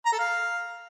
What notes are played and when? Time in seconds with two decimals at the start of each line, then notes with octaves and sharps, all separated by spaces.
0.05 A#5
0.12 A4
0.19 F5